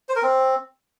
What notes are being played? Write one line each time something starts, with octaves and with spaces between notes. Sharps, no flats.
C5
A#4
C4